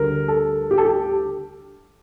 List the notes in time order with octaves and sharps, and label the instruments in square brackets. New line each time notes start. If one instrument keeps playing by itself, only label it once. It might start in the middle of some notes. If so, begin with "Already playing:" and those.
Already playing: [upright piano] D2 D3 G3 A#4
A4
G4
A4
G4